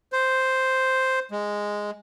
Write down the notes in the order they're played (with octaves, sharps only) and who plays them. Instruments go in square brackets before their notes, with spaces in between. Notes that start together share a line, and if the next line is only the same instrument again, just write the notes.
[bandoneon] C5
G#3